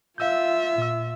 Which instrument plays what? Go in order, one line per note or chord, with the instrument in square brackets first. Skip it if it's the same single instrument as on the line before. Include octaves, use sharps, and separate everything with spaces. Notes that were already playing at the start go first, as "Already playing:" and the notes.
[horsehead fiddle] F4 E5 [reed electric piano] F5 E6 G6
[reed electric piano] A#2 E6